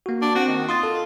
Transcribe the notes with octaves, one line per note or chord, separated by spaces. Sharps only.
A#3 F#4
D4
C4 F#4
D#3
F4 C6 D#6 A6
A4